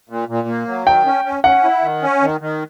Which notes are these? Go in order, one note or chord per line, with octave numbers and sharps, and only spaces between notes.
A#2
A#2
A#3
F#3
D#3 G5
C#4
C#4
C#4 F#5
E4
D#3
C#4
D#3
D#3